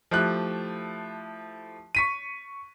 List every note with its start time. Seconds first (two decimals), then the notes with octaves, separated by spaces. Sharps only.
0.11 F3 A3 E4 G4 F#6
1.95 C#6 B6 D#7